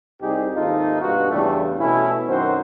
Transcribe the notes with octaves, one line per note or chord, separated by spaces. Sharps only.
C2 G3 C4 D#4 G4 G#4
D#2 G#2 C3 D#4 F4 A4
G2 B2 F4 F#4
E2 A2 C#3 G3 A3 D4
B2 A3 C#4 E4
F#2 D#3 C4 F#4 C5